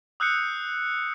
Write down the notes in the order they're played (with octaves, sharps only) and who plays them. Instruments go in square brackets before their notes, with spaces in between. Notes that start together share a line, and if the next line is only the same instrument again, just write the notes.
[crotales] D#6 E6 F#6 G6 C7 C#7